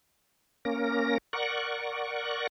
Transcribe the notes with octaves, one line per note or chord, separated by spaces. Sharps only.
A#3 C#4 A#4 A#6
A#4 D5 F#5 C#6